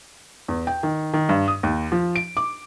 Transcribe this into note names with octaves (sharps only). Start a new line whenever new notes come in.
E2
G5
D#3
D#3
G2
D#6
D#2
F3
D7
D6